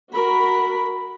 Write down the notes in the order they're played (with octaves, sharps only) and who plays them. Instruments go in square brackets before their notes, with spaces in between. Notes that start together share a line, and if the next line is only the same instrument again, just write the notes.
[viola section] F#4 A#4 B5